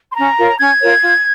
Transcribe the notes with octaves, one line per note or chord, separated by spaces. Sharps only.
C6
C#4 A#5
F4 A#4 C#5
C#4 G#6
F4 A#4 C#5
F4